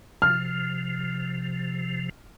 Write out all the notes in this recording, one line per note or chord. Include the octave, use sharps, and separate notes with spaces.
C3 F3 F6